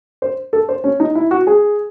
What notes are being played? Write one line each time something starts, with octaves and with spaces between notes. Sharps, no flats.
C5
A4
C5
C#4
D#4
E4
F#4
G#4